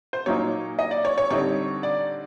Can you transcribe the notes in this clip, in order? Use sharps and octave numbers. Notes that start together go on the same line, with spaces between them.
C5
A#2 F#3 A#3 D#4 C#5
D#5
D5
C#5
C#5
D3 G3 C4 D#4 C#5
D5